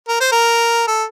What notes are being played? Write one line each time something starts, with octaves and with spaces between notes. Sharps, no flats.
A#4
C5
A#4
A4